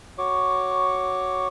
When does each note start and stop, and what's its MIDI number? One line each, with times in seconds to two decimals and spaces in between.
0.18 1.48 66
0.18 1.48 73
0.18 1.48 85
0.18 1.48 86